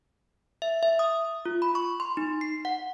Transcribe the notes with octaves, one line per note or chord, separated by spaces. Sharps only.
E5
E5
D#6
F4
B5
C#6
C6
D#4
C7
F#5